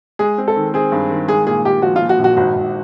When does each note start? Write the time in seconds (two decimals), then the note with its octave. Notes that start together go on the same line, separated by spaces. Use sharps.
0.19 G#3 G#4
0.38 C4
0.48 A4
0.56 D#3
0.74 C4 G#4
0.92 G2
1.10 D#3
1.28 G#3 G#4
1.47 A#2 G#4
1.65 A#2 G4
1.82 F3 F#4
1.96 F4
2.01 A#2
2.09 F#4
2.19 A#1
2.24 F#4
2.37 G#1 F#4
2.56 G#1